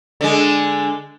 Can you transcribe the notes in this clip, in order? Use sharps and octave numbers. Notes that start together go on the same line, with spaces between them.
D3 G#3